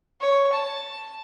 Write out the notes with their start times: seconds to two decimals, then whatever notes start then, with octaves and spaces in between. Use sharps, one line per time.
0.21 C#5
0.53 A5